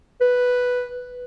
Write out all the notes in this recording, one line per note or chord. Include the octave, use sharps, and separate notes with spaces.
B4